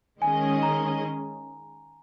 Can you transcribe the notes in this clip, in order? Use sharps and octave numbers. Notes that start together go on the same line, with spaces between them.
D#3 G#3 C#4 G#4 D#5 G#5
A#5